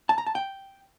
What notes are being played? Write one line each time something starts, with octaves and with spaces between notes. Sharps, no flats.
A5
A#5
A5
G5